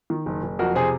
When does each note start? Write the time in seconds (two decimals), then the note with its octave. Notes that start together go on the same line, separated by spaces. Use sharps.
0.10 D#3
0.26 F#1
0.43 F#1
0.59 F2 F#4 A#4
0.75 C3 G#4 C5